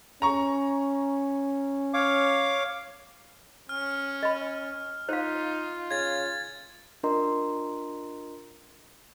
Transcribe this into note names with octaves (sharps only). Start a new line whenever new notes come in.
C#4 A#5 C#6
C#5 F5 D6
C#4 F6
D#5 B5
D#4 F4 C5 F5
C#3 G#6 A6
D4 F4 A#4 D#5 A#5 C6